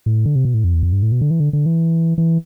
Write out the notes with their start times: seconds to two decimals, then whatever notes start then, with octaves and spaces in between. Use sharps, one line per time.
0.06 A2
0.26 D3
0.35 C3
0.45 B2
0.54 A2
0.64 F2
0.74 E2
0.83 F2
0.93 G2
1.02 A2
1.12 B2
1.21 D3
1.31 E3
1.40 D3
1.53 D3
1.66 E3
2.18 E3